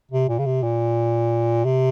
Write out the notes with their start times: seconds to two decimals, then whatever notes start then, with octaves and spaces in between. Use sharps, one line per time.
0.11 C3
0.29 A#2
0.39 C#3
0.46 C3
0.62 A#2
1.65 C3